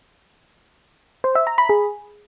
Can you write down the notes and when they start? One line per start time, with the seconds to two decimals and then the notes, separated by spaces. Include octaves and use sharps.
1.24 C5
1.35 E5
1.47 A#5
1.58 B5
1.69 G#4